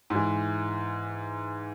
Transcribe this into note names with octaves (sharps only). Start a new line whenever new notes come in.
G#2 E3